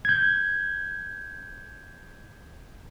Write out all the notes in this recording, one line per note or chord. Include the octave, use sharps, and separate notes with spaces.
G6 G#6